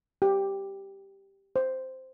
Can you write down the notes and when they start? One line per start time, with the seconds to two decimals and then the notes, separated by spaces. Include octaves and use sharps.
0.22 G4
1.56 C5